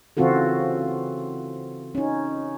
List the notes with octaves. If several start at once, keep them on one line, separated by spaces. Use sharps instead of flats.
C#3 E3 C4 F4 F#4 A4
C#4 D#4